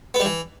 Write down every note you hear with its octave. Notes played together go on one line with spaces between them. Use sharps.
B3
G3
E3